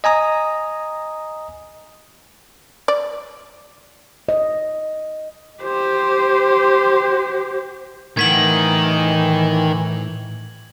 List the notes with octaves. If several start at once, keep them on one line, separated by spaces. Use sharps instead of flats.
D#5 G#5 A#5 D#6
D5
D#5
G4 C5
A2 D#3 E3 F#5 G#6 B6 F#7